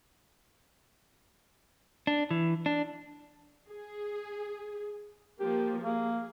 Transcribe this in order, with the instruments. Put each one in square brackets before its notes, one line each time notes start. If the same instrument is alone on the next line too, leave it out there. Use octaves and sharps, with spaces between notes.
[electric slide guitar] D4
E3
D4
[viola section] G#4
[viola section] F3 A#3 [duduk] G4
[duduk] A#3 [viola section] G#4